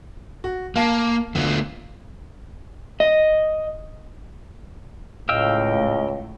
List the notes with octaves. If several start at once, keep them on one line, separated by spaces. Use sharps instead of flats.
F#4
A#3 F5 A5 C7
D2 A3 B3 F4
D#5
C#2 A2 D#5 F5 G5 E6